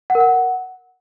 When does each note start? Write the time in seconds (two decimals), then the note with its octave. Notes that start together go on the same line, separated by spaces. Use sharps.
0.10 F#5
0.15 A#4
0.20 F#5